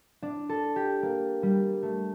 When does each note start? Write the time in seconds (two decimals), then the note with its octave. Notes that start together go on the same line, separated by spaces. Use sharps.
0.22 D4
0.49 A4
0.76 G4
1.03 A#3
1.43 G3
1.83 A3